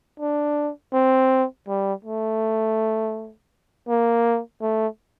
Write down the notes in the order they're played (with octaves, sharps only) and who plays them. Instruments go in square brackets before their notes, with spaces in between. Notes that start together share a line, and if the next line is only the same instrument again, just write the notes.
[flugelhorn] D4
C4
G3
A3
A#3
A3